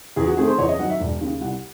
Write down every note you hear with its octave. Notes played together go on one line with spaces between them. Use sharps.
E2 G#4
F#4
D#3 A3 C4 G#4
C5
E2 C#5
D#5
D#3 F#3 F#5
E5
E1
D#2 C#3
C2 F#5